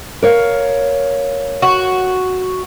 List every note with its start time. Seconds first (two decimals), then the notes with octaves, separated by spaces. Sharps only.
0.22 A#4 C#5 F5
1.62 F#4